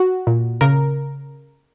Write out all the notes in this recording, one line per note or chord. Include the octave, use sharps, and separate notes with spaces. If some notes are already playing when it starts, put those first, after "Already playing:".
Already playing: F#4
A#2
C#3 A#4